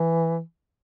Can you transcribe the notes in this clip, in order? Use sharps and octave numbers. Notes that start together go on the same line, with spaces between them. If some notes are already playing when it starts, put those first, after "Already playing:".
Already playing: E3